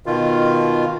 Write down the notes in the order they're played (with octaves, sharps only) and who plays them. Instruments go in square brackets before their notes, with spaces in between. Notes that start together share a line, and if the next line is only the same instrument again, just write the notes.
[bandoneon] B2 D#3 F4